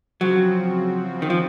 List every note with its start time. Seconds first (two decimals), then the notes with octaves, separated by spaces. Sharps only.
0.21 C#3 F3 F#3 C4 F#4
1.22 D#3
1.30 F3